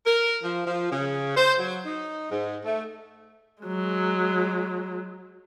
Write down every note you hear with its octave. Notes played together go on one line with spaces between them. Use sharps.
A#4
F3
F3
C#3
C5
F#3
D#4
G#2
A3
F#3 G#3